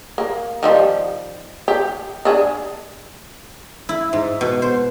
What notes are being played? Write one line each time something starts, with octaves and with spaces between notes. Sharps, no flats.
A#3
D#3 F3 G3
G4
D4 G#4
E4
G#2
B2
C5